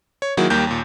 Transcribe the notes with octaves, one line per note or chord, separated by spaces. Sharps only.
C#5
D#3 F#3 A#3 E4 F#4 G#4
D#2 G3 A#3 G5 G6
D#2 A#2